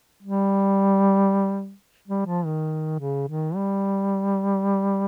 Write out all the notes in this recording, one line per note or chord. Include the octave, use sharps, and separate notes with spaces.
G3
G3
F3
D#3
C#3
D#3
G3